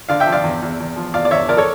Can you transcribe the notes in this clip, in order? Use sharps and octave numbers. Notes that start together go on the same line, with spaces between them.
D3 D5 F5
E5 G5
F3
D5 F5
E2
E2
E2
F3
E2 D5 F5
D5
E2 C#5 E5
F3 A#4 D5
A4 C#5